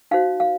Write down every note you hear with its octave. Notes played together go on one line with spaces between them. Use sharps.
D#4 F#4 C5 F5
F5